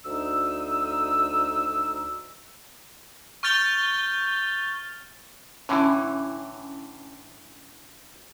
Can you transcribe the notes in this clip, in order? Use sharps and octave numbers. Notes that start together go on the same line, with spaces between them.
D2 D#4 E6
C#6 F6 G6 A6 F7 G7
A2 D3 E3 C#4 E4